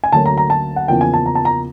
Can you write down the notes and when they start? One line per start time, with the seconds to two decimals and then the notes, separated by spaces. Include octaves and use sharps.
0.04 G#5
0.12 D2 D3 F#3 A#3 C#4 A5
0.26 A#5
0.38 A#5
0.50 A5
0.76 F#5
0.88 E2 C#3 F3 A#3 G5
1.01 G#5
1.14 A5
1.26 A#5
1.35 A5
1.45 A#5